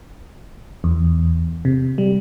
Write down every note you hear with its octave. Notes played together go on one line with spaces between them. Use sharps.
E2
C3
G3